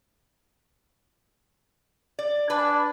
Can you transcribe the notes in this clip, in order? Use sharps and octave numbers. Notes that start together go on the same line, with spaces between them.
D5
D4 B4 G#5